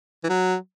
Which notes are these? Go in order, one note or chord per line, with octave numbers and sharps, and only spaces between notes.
E3
F#3